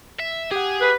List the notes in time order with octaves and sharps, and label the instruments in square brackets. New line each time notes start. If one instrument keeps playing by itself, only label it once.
[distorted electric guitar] E5
[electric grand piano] G4 F#5 [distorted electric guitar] G#4
[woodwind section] B4